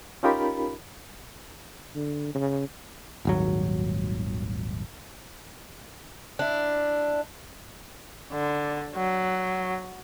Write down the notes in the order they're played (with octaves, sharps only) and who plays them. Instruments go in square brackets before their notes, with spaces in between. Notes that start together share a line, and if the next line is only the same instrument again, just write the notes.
[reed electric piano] C#4 D#4 F4 G4 A#4 B5
[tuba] D3
C#3
[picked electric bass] D#1 G#1 F#3
[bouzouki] D4 E4
[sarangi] D3
F#3